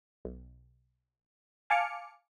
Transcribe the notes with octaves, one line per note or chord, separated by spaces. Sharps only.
B1
F5 G#5 A5 D6 F6 C#7